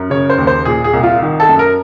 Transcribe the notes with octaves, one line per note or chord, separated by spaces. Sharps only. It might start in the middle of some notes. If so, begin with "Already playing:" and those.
Already playing: F#2
C#3 C#5
C5
D#2
C5
A#2 G#4
G#4
C2
F4
D#3
A4
F#2
A#4